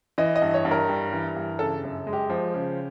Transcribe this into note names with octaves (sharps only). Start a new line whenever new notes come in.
E3 D#5
D#5
G2
C#5
G2
A#4
G3
E3
G2
C#3 A4
F#2
G#3
G4
F3
C#3